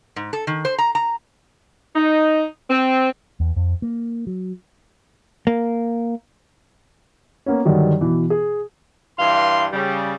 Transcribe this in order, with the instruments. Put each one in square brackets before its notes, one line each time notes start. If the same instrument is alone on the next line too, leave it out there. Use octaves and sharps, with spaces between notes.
[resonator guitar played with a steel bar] G#2
A4
D#3
C5
A#5
A#5
[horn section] D#4
C4
[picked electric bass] E2
F2
A#3
F#3
[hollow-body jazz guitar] A#3
[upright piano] A#3 B3 C#4
G2 D3 D#3 F#3
B2 E3
G#4
[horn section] G2 E3 F5 C6
C#3 G3